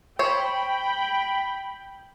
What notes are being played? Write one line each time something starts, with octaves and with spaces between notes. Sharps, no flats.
C5 C#5 G5 B5